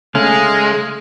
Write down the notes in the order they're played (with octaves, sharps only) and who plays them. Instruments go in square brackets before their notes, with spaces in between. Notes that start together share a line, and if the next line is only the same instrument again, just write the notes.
[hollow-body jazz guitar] C#3 A3 C#4 [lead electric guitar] G#3 [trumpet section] D#4 G#4 [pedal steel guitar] F5